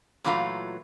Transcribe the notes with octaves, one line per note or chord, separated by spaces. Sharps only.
A#2 E3 F#3 A3 F4 A#5